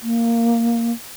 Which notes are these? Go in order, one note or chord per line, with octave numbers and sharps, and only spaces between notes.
A#3